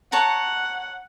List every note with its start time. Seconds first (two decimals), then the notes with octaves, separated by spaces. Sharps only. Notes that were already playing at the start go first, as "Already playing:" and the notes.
0.12 C#5 F#5 A5 A#5